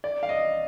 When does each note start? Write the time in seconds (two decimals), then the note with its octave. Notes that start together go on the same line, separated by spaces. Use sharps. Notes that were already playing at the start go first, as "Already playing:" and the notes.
0.04 D5
0.23 F5
0.29 D#5